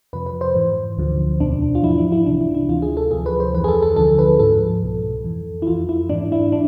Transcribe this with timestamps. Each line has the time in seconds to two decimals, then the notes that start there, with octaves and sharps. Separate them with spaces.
0.13 F2 C3 F3 B4
0.26 B4
0.41 C5
0.55 G#2 E3
0.97 D2 D3 F3
1.40 E2 B2 D4
1.75 F4
1.83 G#2 F3 E4
1.98 D4
2.12 E4
2.26 C2 C3 E3 D4
2.41 E4
2.55 E4
2.69 D2 C3 E3 F4
2.82 G#4
2.97 A4
3.11 D2 C3 F3 G#4
3.26 B4
3.40 C5
3.54 F2 E3 B4
3.64 G#4
3.68 A4
3.82 A4
3.96 D2 D3 F3 A4
4.19 B4
4.39 G#2 F3 A4
4.83 C2 B2
5.25 F2 E3
5.62 E4
5.67 F2 E3 F4
5.89 E4
6.09 G#2 E3 D4
6.32 E4
6.52 D4